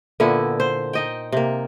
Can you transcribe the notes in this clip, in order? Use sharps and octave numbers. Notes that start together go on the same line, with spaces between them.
A#2 D3 B3 E4
C5
D#4 D#5 G5
C3 A#3